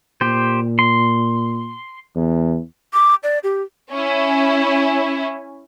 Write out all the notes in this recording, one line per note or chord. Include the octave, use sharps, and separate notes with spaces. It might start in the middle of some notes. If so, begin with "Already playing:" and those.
A#2 G4 C5
C6
E2
D6
D5
G4
C#4 E4